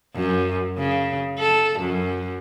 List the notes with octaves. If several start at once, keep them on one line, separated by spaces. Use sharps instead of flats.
F#2
C#3
A4
F#2